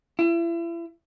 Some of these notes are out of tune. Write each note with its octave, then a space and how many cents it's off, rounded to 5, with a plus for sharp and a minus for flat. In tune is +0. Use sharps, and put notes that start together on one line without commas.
E4 +35